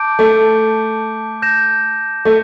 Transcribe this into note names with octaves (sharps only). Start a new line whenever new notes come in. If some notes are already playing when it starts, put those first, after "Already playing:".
Already playing: A5 D6 G6 D7
A3
G6 A#6 E7
A3